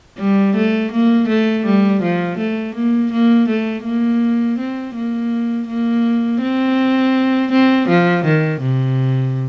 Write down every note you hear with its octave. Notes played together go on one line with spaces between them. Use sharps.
G3
A3
A#3
A3
G3
F3
A3
A#3
A#3
A3
A#3
C4
A#3
A#3
C4
C4
F3
D#3
C3